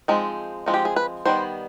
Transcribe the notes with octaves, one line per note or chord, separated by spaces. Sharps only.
F3 G#3 C4 D#4
F3 G#3 C4 D#4
G4
G#4
B4
D#3 G3 B3 C5